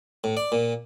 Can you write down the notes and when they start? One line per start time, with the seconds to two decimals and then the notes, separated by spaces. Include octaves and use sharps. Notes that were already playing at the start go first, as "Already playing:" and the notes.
0.24 A2
0.37 D5
0.52 A#2